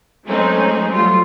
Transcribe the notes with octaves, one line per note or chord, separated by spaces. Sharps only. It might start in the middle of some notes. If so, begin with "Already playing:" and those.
F#3 G#3 A3 C4 C#4 D#4
F#3 G3 A3 F4